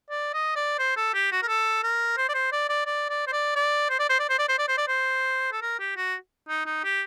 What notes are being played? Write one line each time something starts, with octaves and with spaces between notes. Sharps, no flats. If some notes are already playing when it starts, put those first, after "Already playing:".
D5
D#5
D5
C5
A4
G4
F#4
A#4
A4
A#4
C5
D5
C5
D5
D5
D5
D5
C5
D5
D5
C5
D5
C5
D5
C5
D5
C5
D5
C5
D5
C5
A4
A#4
G4
F#4
D#4
D#4
G4